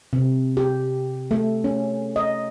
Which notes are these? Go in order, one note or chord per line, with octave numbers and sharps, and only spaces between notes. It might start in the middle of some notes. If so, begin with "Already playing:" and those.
C3
G4
A3
C#4
D#5